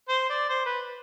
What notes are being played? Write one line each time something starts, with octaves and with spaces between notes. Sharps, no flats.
C5
D5
C5
B4